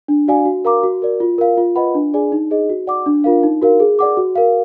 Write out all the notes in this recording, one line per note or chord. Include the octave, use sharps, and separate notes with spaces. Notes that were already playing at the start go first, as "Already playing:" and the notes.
D4
F#4 D5 F5 G#5
F#4
A#4 F5 A#5 D6
F#4
A#4 D5
F4
A#4 F5
F4
B4 D#5 F#5 B5
D4
G#4 D5 G#5
D#4
G#4 D#5
F#4
D5 F#5 D6
D4
F4 A#4 F5
D#4
F#4 A#4 F5
G#4
D5 F#5 D6
F#4
A#4 F5